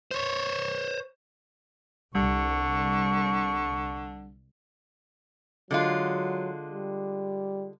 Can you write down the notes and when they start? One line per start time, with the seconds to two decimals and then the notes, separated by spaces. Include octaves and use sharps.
0.11 C5 C#5
2.15 C2 D3 G3 C#6
5.71 D3 F#3 G#3 F4
6.72 G3